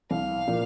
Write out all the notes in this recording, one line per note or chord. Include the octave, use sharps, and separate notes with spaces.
C2 F5
A#2 F3 A#3